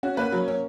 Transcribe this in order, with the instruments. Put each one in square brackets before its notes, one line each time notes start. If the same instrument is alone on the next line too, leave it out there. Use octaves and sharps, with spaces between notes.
[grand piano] C#4 [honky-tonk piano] F#4
[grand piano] A#3 [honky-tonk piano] B4
[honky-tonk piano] F#3
C#4